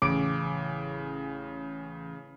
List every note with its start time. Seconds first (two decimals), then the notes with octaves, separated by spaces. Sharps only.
0.02 A1 C#3 D6 D7